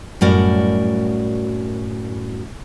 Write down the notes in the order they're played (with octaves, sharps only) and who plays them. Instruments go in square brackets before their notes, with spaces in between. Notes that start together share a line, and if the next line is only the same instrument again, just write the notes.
[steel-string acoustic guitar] F#2 A2 G3 F#4 A#4 D5